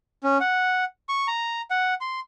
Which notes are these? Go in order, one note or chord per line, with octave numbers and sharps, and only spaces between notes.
C#4
F#5
C#6
A#5
F#5
C6